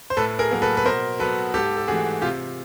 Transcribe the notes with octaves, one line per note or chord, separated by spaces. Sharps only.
C5
A2 A4 B4
G#4 A#4
F#3 A#3 A#4
A4 B4
B4
B2 A#4 C5
F#3 B3 A4 B4
G#2 G4 A4
A4
E3 A3 F#4 G#4
C3 F4 G4